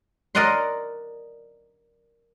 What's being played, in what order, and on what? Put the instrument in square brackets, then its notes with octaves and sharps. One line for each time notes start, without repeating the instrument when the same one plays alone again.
[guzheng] A#4 D5 D#5 F#5 A#5 C6